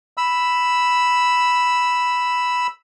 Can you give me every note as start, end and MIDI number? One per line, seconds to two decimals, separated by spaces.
0.17 2.67 83
0.17 2.67 88